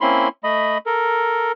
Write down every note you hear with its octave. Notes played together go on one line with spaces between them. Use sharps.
A#3 C4 C#4 E4 B5 C6
A3 D#5 B5
A4 A#4